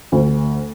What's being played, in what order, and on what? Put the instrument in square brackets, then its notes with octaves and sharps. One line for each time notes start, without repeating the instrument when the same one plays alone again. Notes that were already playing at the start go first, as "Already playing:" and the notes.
[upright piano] D2